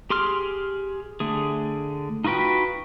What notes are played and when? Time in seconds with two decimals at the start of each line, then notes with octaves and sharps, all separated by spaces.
0.10 G4 G#4 C6 D6 F6
1.20 D3 A3 G#4
2.24 D#4 F4 F#4 B4 G5